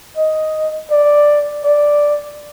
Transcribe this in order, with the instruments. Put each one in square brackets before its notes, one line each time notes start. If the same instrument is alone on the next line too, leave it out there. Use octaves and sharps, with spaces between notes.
[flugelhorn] D#5
D5
D5